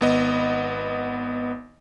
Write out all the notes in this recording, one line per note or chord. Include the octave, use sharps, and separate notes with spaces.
G#1 B3 D#5